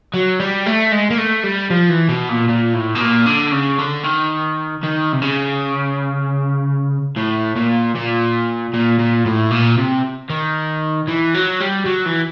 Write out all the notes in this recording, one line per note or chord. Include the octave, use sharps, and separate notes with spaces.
F#3
G3
A3
G#3
A#3
A3
G3
F3
E3
B2
A#2
A#2
A2
B2
A#2
D3
C#3
D3
D#3
D#3
C3
C#3
A2
A#2
A#2
A#2
A#2
A2
A#2
C3
D#3
E3
F#3
G3
F#3
E3